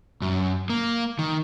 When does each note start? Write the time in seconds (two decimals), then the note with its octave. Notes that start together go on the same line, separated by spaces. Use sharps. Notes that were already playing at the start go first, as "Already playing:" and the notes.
0.22 F#2
0.70 A#3
1.19 D#3